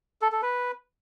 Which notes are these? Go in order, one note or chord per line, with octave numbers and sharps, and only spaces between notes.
A4
A4
B4